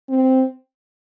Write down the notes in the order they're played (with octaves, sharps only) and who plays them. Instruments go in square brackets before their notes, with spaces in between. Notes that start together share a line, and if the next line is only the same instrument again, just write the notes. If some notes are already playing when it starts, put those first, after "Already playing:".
[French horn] C4